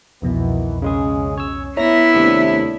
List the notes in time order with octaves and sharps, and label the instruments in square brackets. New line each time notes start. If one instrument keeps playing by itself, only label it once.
[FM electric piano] C2 F2 B2 [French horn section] D#3 E3 B3
[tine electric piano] C#3 G#3 G#4 [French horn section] C#4
[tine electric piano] C#5 E6
[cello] B3 E4 [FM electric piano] C#5 E5 [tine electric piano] A#5 A#6 B6
[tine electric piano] D#2 C3 E6 [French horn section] A3 D4